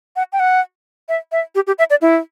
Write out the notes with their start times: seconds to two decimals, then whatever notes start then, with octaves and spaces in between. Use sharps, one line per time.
0.16 F#5
0.33 G5
0.40 F#5
1.09 E5
1.32 E5
1.55 G4
1.67 G4
1.79 E5
1.90 D5
2.01 E4